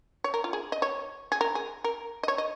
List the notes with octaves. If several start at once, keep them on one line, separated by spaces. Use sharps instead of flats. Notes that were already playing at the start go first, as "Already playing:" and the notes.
C#5
A#4
F4
G#4
D#5
C#5
G#4
A#4
G#4
A#4
D#5
C#5
D#5